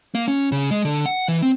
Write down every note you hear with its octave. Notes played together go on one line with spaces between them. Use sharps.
A#3
C#4
C#3
G#3
D3
F#5
E3
C4